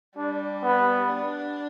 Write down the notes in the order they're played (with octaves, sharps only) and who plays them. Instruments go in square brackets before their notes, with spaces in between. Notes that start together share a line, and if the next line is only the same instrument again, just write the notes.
[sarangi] G3 [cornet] D4
[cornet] B3
[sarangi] D4